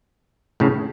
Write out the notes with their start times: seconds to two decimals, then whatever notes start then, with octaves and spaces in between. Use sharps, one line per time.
0.60 A2 C#3